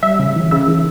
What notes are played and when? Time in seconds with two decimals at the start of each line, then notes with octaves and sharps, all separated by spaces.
0.03 G3 E5
0.20 C#3
0.36 E3
0.51 C#3 E5
0.68 E3